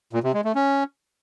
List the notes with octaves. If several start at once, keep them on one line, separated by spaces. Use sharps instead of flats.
A#2
C3
G#3
A3
C#4